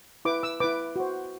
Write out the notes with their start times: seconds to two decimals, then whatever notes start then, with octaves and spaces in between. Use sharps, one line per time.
0.25 E4 B4 D6
0.43 E6
0.60 E4 B4 D6
0.96 F#4 C5